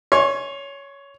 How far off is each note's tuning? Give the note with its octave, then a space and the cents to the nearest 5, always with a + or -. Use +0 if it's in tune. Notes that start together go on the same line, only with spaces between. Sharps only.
C#5 +10 G#5 +0 C6 +45